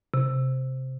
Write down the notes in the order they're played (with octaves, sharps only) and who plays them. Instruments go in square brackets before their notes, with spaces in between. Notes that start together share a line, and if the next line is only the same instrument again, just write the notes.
[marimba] C3